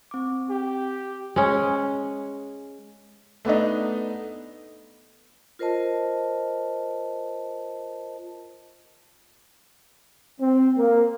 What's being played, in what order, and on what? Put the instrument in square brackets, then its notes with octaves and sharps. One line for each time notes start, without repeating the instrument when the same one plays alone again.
[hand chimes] C4 D6
[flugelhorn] G4
[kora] G#3 C#4
[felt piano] A3 B3 D4 D#4
[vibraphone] F4 A#4 C5 D#5 A5
[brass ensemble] C4
A#3